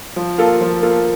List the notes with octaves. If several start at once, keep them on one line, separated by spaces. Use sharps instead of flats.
F3
A#3 F4 A4
F3
A#3 F4 A4